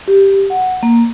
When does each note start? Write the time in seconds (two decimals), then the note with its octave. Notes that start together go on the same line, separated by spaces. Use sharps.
0.08 G4
0.50 F#5
0.83 A#3